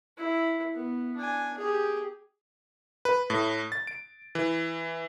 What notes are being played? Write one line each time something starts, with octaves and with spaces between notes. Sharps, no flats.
E4
B3
D4 G#5
G4 G#4
B4
A2
A6
D7
E3